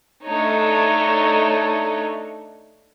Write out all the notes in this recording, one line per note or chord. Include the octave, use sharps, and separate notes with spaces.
A3 D4 D#4 C#5